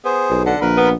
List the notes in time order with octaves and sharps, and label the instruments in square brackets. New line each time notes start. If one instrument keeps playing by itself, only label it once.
[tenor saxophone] B3 [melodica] G#4 C5
[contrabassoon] B1
[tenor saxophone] D3 [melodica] F#5 A5
[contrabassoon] A#1 [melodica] A#4 B4 B5
[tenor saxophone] B3